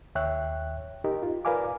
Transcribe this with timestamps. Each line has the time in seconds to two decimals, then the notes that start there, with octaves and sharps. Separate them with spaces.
0.15 D#2 C#5 E5 G5 F#6
1.04 D#4 G4 A#4 D#5
1.23 F4
1.45 A#4 B4 D5 F5 G#5 D6